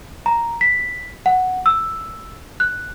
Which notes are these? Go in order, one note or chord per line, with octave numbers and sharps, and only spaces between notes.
A#5
B6
F#5
E6
F#6